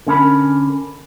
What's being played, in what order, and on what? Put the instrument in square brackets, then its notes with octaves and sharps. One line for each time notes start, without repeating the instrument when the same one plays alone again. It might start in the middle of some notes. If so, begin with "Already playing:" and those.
[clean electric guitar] D3 C#4 A#4 B5